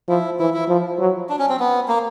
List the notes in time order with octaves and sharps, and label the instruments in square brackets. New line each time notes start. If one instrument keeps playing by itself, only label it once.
[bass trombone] F3 [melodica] E4
[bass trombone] E3 [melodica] E4
[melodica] E4
[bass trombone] F3
F#3
[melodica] D4
C#4
C4
B3
A#3